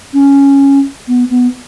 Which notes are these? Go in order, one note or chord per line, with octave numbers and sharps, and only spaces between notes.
C#4
B3
B3